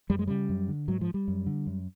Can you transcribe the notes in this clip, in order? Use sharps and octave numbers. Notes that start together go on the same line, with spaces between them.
F#2 G3
G#3
C#3 G3
F#2
D3
G#2 F#3
F3
G3
F#2
D3
F#2